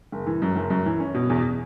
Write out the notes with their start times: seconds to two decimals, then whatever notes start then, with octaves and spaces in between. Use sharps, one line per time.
0.12 F#1
0.27 E3
0.42 F#2
0.56 F#1
0.70 F#2
0.86 E3
1.00 C#4
1.14 B2
1.29 E2